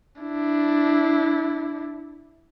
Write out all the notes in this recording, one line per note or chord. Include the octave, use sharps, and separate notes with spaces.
D4 E4